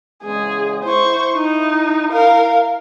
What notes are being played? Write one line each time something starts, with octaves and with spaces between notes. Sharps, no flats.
E2 C#3 G#3 G#4
E4 C5 C#6
D#4
A#4 F5